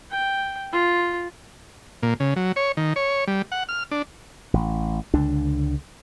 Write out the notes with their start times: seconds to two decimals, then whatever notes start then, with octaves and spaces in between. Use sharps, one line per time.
0.11 G5
0.73 F4
2.03 A#2
2.20 C#3
2.36 F#3
2.56 C#5
2.77 D#3
2.96 C#5
3.27 G3
3.52 F#5
3.69 F6
3.91 D4
4.54 A1
5.14 C#2 D3 D4